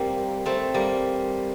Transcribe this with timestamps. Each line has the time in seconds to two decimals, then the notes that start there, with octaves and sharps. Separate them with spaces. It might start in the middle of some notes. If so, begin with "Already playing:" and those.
Already playing: G3 A#3 C4
0.46 A3 C4
0.74 G3 A#3